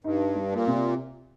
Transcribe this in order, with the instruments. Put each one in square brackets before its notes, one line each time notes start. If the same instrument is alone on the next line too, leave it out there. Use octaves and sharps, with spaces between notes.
[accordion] G2 [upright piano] D#4
[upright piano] G3
[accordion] A#2
[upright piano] C3